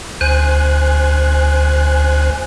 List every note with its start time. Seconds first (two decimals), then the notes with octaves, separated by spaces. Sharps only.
0.21 D2 C5 G#5 F#6